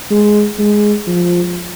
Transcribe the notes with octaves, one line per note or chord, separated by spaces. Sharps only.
G#3
G#3
F3